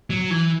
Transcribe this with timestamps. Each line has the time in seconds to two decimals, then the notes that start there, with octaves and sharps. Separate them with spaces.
0.10 F#3
0.30 E3